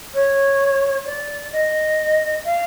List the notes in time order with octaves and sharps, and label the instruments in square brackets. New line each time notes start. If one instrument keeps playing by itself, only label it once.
[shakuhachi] C#5
D5
D#5
F5